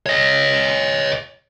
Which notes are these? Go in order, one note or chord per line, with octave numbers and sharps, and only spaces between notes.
C#5 D#5